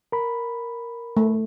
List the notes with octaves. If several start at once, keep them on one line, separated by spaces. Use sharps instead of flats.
A#4 B5
A3